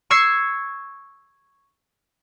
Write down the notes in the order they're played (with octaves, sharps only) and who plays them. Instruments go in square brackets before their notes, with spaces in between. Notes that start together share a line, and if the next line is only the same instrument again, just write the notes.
[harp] C#6 E6 G#6 C7 C#7